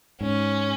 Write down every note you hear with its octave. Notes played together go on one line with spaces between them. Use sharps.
G#2 C#4